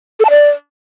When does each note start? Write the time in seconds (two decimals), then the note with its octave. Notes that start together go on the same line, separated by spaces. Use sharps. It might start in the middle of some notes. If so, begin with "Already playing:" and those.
0.20 A4
0.25 A5
0.30 D5